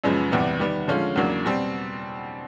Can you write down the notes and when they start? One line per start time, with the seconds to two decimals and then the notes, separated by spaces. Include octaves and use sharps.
0.04 F#2 C#3 F3 G#3 B3
0.32 E2 C3 E3 G3 B3
0.59 D#3 G3 B3
0.88 D3 F3 G#3 C#4 F4
1.16 E2 C#3 F#3 A#3 D4
1.45 B2 G3 C4